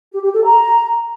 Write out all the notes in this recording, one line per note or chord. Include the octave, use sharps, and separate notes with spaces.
G4
G4
A4
A#5